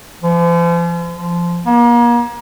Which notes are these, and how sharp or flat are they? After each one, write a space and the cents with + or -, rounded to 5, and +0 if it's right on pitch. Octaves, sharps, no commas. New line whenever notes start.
F3 -40
F3 -15
A#3 +35